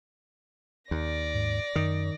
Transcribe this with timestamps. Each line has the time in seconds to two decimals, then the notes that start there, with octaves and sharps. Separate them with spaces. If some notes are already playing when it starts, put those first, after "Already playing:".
0.91 D#2 D5 A#6
1.34 G#2
1.76 F#2 D#3